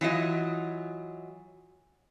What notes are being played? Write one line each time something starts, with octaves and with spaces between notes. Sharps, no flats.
E3 F#3 F4 D#5